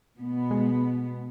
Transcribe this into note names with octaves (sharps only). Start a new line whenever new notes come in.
B2 B3
G#3